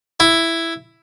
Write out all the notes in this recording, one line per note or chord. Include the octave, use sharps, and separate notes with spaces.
E4